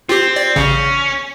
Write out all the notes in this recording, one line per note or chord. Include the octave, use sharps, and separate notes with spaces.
C4 F4 G4
D5
A1 C#3 C#4